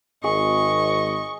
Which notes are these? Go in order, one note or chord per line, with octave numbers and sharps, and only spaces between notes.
G#1 G#4 D#5 C#6